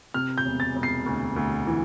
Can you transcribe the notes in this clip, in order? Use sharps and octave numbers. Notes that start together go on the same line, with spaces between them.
C3 F6
G6
E1
A6
E1
C7
D2
D2
E3